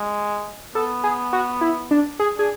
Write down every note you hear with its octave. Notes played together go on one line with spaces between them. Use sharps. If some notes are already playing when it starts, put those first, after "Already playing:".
Already playing: G#3
B3 A4
G#4
F#4
E4
D4
G#4
D4 G#4